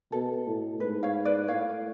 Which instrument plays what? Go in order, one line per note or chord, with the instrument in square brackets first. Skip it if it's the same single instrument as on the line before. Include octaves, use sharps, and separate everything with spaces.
[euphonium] B2 [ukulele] A4
[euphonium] A2
[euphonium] G#2 [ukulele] B4
[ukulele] C#5 F5
B4 D5
[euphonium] A2 [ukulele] C#5 F5